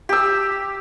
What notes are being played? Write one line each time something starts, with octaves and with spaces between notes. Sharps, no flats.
G4 E6